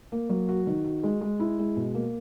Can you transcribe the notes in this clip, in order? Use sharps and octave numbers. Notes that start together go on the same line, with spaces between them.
A#3
F#3
F#4
D#3
F#4
G#3
G#3
E4
G#3
B2
A#3